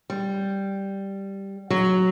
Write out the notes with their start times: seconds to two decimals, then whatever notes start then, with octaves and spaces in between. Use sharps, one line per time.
0.10 G3
1.70 F#3